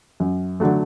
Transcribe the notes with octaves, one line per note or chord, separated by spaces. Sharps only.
F#2
D3 F#3 A3